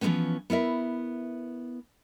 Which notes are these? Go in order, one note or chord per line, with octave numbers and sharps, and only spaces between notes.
E3 F3 G#3 A3 B3 C#4
B3 E4 A#4 E5